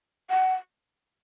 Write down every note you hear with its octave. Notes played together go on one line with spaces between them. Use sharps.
F#5